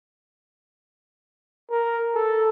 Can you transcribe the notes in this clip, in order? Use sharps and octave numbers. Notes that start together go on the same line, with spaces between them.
A#4
A4